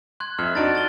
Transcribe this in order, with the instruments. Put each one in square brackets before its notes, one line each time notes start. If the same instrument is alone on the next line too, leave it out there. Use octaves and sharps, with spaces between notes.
[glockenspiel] C6 F#6 G#6
[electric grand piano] F2 E5 [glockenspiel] F6
[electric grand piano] D4 D#4 F#4 [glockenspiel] A6 D7
[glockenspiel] A6 G7